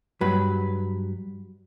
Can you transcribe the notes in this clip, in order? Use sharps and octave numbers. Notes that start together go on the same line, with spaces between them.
G2 F#3 B4